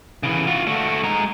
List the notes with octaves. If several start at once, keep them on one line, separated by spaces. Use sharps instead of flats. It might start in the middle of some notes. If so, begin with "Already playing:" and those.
C#3 E3
F4 F#4
A3 F#4
G#3 A#5